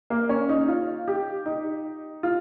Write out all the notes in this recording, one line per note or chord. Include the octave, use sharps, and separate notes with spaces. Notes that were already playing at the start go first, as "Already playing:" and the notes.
A#3
C#4
D#4
F4
G4
D#4
F4